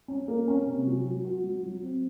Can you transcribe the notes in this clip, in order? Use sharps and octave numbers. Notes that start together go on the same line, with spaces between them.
C#4
A#3
C#4
C3
F#3
F#3
F#4
F#3
F#3
C4